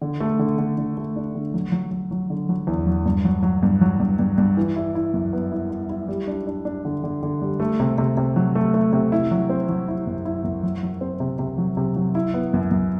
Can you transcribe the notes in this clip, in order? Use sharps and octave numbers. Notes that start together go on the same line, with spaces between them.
D3
A3
D3
D3
D3
A3
D4
D3
F#3
F#3
F#3
F#3
D3
F#3
E2
F#3
G2
F#3
F#3
G2
F#3
G2
G2
G2
E3
E4
E4
F#2
B3
E4
E4
E4
G3
D4
D4
D4
D3
D3
D3
G3
A3
C3
C3
C3
F#3
A3
A3
C3
E4
F#3
C4
F#3
E4
F#2
E4
F#2
F#3
F#3
C4
C3
C3
F#3
C3
F#3
E4
B3
F#2
F#2